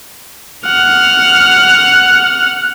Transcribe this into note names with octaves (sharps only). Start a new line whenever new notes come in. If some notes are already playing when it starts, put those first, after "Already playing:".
F#5 F6